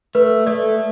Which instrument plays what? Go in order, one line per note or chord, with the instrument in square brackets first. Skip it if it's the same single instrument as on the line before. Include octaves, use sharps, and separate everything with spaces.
[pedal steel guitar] A3 [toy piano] B4
[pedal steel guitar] A3 [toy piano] A4 D5